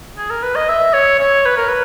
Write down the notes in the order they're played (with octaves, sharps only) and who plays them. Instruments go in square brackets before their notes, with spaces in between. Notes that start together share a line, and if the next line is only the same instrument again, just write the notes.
[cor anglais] G#4
A#4
B4
D#5
E5
C#5
C#5
B4
A#4
B4